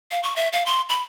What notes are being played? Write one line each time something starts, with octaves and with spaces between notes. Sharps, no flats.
F5
C#6
E5
F5
C6
B5